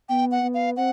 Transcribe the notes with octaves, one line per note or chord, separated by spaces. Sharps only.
B3 G5
F#5
B3
F5
C4 F#5